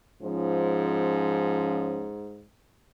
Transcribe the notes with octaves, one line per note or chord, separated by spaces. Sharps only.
G#2 F3 C#4